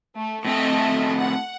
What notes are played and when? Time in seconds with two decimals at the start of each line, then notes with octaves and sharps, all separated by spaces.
0.15 A3
0.45 A2 A3 C4 D#5 E5 G5
1.17 F#5